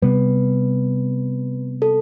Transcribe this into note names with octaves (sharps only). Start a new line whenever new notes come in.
C3 G3 B3 B4
A4